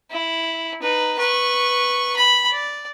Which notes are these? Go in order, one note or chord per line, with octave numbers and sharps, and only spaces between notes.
E4
D#4 B4
B4 C#6
B5
D5